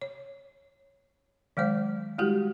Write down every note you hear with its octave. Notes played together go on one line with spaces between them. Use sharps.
C#5
D#3 F#3 G#3 C5
G3 G#3 E4 F#4 G4